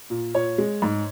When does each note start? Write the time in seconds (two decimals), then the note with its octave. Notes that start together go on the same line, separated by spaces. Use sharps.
0.10 A#2
0.35 A#2 C#5
0.58 G#3
0.82 G#2